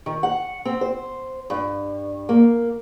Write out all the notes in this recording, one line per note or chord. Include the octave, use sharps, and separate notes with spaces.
D#3
F#5
C4
C5
G2
A#3